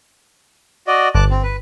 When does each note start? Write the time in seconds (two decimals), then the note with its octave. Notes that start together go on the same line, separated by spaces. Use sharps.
0.87 F#4 D5 D#5
1.15 G1 A5 D6 F#6
1.31 C4
1.43 B4